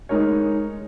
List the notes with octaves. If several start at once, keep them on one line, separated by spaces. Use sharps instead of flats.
G#3 D#4 A#4 C#5